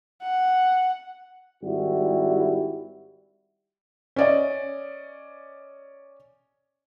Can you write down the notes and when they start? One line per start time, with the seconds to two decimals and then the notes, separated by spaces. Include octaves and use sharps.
0.22 F#5
1.63 G#1 G3 E4 F#4 G4
4.16 C#4 D5 D#5